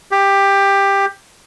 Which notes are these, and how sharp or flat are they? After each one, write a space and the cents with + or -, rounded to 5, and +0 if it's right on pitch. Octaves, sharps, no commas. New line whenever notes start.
G4 +15